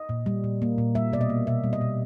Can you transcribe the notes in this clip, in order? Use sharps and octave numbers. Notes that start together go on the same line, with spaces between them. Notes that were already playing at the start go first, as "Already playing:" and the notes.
Already playing: D#5
A#2
G3
A#2
A#3
A#2
G3 E5
B2 D5
D#5
A#3
B2 E5
G3
D#5
B2